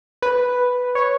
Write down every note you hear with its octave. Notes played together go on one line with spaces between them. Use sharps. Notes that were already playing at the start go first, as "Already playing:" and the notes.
B4
C#5